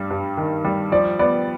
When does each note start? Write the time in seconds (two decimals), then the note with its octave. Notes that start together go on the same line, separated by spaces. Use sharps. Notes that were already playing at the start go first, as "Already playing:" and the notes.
Already playing: G2 G3
0.10 G2
0.37 D#3
0.65 G3
0.92 F3 D5
1.19 B3 D5